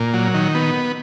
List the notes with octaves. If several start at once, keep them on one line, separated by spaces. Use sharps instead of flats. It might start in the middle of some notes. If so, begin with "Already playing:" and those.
Already playing: A#2
F#3
D#3
B3